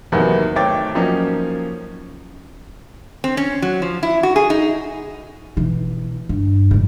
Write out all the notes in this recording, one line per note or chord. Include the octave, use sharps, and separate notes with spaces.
E2 C3 D#3 F#3 A#3 B3
G#1 A3 C#5 G5 D6 A6
F3 F#3 A#3 C#4 D#4
C4
C#4
F#3
F3
E4
F#4
G#4
D#4
B2 E3
G2
F2 A2